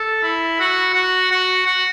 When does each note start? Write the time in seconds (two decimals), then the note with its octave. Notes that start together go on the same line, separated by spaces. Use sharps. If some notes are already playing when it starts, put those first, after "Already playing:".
Already playing: A4
0.23 E4
0.60 F#4
0.94 F#4
1.31 F#4
1.66 F#4